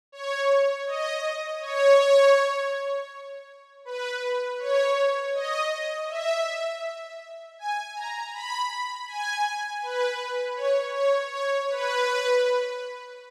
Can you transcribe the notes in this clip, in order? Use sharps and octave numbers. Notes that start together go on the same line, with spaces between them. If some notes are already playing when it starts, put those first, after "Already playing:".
C#5
D#5
C#5
B4
C#5
D#5
E5
G#5
A#5
B5
G#5
B4
C#5
C#5
C#5
B4